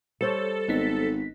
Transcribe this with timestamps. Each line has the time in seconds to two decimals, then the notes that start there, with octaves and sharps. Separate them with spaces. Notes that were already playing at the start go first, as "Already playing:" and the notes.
0.21 G3 A4 C5 C#5
0.68 G#1 B3 D#4 B6